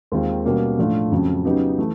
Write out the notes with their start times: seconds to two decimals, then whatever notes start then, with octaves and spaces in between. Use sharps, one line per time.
0.12 D#2 D#3 G#3 C4 F4
0.45 B2 G3 A#3 C#4
0.78 A2 F3 A3 D4 F4
1.11 F2 C#3 F#3
1.45 C#3 F#3 B3 D#4 G4
1.78 E3 A3